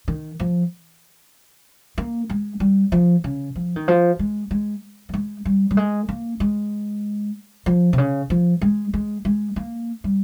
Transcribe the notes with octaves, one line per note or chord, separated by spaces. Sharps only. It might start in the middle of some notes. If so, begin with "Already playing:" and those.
D#3
F3
A#3
G#3
G3
F3
C#3
F3
D#3
F3
G#3
G#3
G3
G#3
G3
G3
G#3
A#3
G#3
F3
C3
C#3
F3
G#3
G#3
G#3
A#3
G3